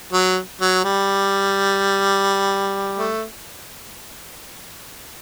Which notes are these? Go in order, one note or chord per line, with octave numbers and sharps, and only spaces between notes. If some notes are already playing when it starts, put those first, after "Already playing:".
F#3
F#3
G3
A3